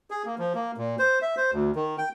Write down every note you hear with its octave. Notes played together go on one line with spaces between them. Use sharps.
G#4
A#3
F3
A#3
A#2
C5
E5
C5
D2
D#3
G5